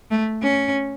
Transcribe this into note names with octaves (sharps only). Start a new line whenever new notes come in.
A3
C#4